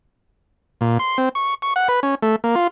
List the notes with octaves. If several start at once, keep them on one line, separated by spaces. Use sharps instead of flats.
A#2
C6
C4
C#6
C#6
F#5
B4
C#4
A3
A#3
F4